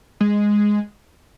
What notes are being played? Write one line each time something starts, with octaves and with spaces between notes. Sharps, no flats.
G#3